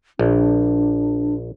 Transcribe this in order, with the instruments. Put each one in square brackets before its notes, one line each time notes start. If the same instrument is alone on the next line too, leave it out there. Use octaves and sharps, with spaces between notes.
[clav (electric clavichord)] A#1 [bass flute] D4